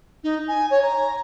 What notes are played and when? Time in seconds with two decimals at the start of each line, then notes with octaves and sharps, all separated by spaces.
0.23 D#4
0.47 G#5
0.70 C#5
0.82 A#5